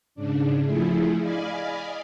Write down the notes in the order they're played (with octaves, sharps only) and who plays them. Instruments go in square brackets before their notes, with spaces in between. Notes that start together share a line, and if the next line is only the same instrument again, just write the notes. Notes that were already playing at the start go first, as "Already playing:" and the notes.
[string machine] G#2 C#3 D4
F3 A3 E4 G#4
D5 D#5 F5 G#5 B5